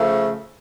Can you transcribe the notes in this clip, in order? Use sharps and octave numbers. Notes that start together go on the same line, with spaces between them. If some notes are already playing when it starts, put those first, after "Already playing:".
Already playing: C#3 F3 A3